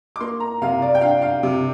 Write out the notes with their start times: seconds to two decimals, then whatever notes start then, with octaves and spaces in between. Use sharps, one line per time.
0.16 D6
0.20 A#3 C6
0.40 A#5
0.62 C3 F5
0.82 D5
0.95 G5
1.01 D4 F5
1.22 F5
1.43 C3